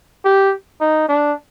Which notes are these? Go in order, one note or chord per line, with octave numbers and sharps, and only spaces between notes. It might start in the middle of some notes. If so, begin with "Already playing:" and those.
G4
D#4
D4